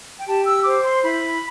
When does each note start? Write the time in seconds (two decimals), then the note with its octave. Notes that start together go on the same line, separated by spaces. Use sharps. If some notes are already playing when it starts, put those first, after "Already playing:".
0.19 G5
0.27 G4 A5
0.46 E6
0.65 C5 D6
0.84 C6
1.04 E4 B5